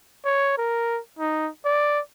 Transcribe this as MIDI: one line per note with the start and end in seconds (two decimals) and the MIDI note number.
0.25 0.54 73
0.58 0.99 70
1.19 1.49 63
1.65 2.00 74